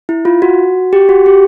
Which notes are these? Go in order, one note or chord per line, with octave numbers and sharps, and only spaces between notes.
E4
F4
F#4
G4
F#4
G4